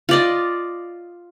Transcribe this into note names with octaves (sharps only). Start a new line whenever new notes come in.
F4 D5 D#5